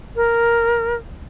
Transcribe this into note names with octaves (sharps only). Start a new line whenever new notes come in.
A#4